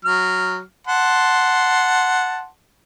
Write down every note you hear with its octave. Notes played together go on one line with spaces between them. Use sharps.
F#3 F6
F#5 A5 C6